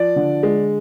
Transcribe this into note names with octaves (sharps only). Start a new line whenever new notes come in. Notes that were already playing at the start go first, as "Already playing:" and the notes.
Already playing: F3 D5
D3
G#3